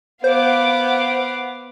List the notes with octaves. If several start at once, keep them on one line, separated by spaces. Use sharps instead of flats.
B3 C5 F5 F#5 D6